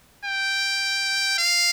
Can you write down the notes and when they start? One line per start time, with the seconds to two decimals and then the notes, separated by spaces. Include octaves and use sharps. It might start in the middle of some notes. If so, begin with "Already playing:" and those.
0.25 G5
1.39 F5